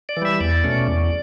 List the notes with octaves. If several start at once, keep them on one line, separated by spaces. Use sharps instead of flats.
D5
E3
G3 E5
E2 D5
B2 A3 C#4
E2